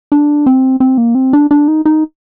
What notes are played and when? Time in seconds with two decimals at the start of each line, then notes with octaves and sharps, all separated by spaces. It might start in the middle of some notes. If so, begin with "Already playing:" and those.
0.12 D4
0.46 C4
0.80 C4
0.98 A#3
1.15 C4
1.33 D4
1.51 D4
1.68 D#4
1.85 D#4